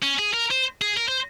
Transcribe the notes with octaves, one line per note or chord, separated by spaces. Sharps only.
C#4
G#4
A#4
C5
G#4
A#4
C5